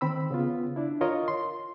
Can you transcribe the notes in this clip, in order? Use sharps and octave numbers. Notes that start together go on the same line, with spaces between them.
D#3 C4 B5 E6
C#3 B3 F4
D4 E4
F4 A#4 C#5 D#5
C6